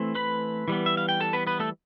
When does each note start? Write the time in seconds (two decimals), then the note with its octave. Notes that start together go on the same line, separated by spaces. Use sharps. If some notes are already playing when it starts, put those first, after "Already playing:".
Already playing: E3 A3 C4
0.15 B4 B5
0.68 E3 G3 B3
0.86 E5
0.97 F5
1.09 G5
1.20 A4 A5
1.33 B3 B4
1.47 B3 B4
1.60 A3 A4